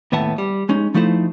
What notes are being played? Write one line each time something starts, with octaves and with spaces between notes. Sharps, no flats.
D#2 A2 B3 E5 F#5 A5
G3
G#3 C#4 D#4
F3 A3 D#4 E4 C5